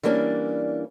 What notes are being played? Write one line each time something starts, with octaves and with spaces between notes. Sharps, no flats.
E3 G3 A#3 C#4 D4